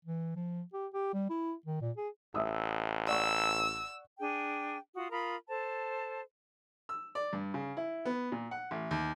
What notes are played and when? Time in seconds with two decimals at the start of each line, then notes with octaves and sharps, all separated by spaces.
0.05 E3
0.36 F3
0.73 G4
0.94 G4
1.13 G3
1.30 E4
1.66 D#3
1.82 A#2
1.97 G#4
2.35 A1 E5 D#6 E6
3.08 D5 F#5 C#6 E6
4.19 D4 G#4 G5
4.96 F4 F#4 D#6
5.12 F4 A#4 B5 D#6
5.48 A4 C5 A5
6.89 E6
7.15 D5
7.33 G2
7.54 C#3
7.77 E4
8.05 B3
8.32 A#2
8.51 F#5
8.71 A1
8.91 D#2